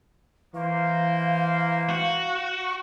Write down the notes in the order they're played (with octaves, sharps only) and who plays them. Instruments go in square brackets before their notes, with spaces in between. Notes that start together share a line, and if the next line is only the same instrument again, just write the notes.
[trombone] E3 [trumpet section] A#3 C5 [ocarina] F5
[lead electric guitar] F#4